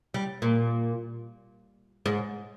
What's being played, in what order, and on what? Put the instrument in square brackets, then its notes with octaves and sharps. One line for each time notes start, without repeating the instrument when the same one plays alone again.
[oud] G3
A#2
G#2